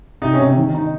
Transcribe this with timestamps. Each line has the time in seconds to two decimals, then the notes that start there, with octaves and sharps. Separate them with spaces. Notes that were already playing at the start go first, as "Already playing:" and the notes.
0.22 C3 D#4
0.33 C#4
0.39 C3
0.56 D#3
0.74 D#4